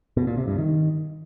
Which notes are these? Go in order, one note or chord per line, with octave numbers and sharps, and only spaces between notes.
B2
A#2
C3
G2
D#3